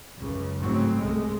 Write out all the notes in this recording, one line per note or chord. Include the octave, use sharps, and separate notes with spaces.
C#2 F#2 C#3
A1 G#2 C#3 F#3 A3 C4
G1 C2 G#3 A3